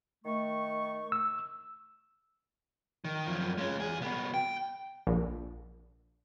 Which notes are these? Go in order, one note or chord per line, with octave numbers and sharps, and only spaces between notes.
D#3 A3 C#6
E6
D#3
F#2 F3
G#3 C#4
E2 G#4
C2 B3
G5
A#1